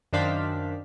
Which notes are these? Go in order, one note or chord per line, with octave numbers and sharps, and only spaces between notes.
F#2 D#3 D4 C5 F5 B6